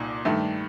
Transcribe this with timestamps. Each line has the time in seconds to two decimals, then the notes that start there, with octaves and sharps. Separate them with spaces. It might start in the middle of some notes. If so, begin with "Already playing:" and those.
Already playing: C2 A#2 D#4
0.25 G2 D#3 A3 D4